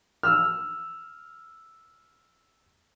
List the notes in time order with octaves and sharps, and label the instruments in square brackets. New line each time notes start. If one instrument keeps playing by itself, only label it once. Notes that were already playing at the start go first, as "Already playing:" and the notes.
[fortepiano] E6 F6